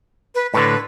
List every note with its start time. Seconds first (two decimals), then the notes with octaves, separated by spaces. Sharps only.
0.35 B4
0.54 A2 D3 B4